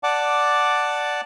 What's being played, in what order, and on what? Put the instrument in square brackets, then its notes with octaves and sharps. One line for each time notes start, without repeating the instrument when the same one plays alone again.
[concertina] D5 F#5 A5 D6